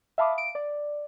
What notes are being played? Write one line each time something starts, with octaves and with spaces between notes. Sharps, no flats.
E5 F5 A5 B5 D6 D#6
D7
D5